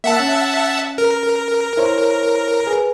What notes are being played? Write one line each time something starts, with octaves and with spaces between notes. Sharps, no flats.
A#3 E5 F#5 A5
C#4
A#4
E4 C5 C#5
G#4 B4